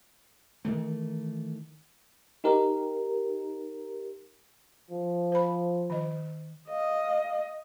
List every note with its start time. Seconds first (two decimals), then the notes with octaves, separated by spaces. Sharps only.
0.65 D#3 E3 A3
2.44 D#4 G4 A#4
4.91 F3
5.32 C5 B5
5.90 D#3 D#5
6.69 D#5 F5